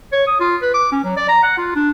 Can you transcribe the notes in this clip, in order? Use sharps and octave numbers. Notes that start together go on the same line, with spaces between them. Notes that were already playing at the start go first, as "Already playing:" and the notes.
C#5
D#6
F4
B4
D6
C#4
F#3
D5
A#5
F#5
F4
D4